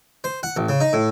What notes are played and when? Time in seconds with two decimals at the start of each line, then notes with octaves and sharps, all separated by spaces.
0.24 C5
0.43 F#5
0.56 A1
0.69 C#3
0.80 D#4
0.93 A2